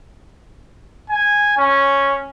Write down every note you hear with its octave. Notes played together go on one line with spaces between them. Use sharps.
G#5
C#4